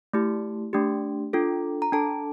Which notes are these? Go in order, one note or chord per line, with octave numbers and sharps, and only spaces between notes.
A3 E4 G4
A3 D4 G4
D4 F4 A4
A#5
D4 A4 A5